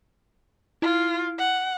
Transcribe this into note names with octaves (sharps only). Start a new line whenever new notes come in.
E4 F4
F#5